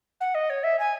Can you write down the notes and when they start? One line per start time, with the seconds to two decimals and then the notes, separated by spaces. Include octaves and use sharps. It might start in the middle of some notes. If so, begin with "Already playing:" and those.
0.20 F#5
0.34 D#5
0.49 C#5
0.63 E5
0.79 G#5